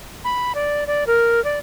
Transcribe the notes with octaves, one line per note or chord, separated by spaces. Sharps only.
B5
D5
D5
A#4
D5